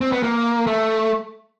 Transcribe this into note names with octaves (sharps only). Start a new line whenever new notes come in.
C4
B3
A#3
A3